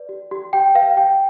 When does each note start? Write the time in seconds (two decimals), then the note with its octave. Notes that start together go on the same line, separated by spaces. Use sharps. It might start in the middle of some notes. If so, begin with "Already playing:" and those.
Already playing: B4 D5
0.09 G4
0.31 G4
0.53 G4 G5
0.75 B4 F5
0.97 G4 G5